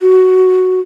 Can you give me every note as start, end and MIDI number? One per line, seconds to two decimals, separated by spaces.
0.01 0.80 66